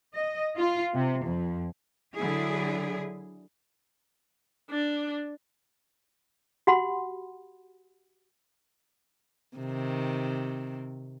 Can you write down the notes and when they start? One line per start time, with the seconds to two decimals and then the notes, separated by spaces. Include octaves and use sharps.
0.14 D#5
0.57 F4
0.94 C3
1.25 F2
2.15 D3 F#3 E4 G#4
4.70 D4
6.67 F#4 G4 F#5 B5 C6
9.57 C3 D#3